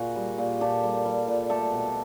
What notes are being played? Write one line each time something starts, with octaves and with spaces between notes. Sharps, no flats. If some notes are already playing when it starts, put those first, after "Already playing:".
Already playing: A#2 F#4 G#4
G3
A#2
A#2 G4 A4
G3
G3
A#2
A3 G4 A4
B2